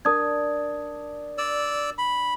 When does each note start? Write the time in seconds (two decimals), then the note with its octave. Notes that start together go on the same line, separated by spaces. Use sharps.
0.05 D4 A#4 D#6 G#6
1.38 D5 E6
1.98 B5